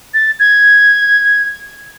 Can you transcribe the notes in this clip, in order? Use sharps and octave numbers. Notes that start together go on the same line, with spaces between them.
A6
G#6